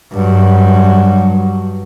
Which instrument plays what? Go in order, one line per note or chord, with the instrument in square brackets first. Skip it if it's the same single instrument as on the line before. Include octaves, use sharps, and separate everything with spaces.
[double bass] G2 F#3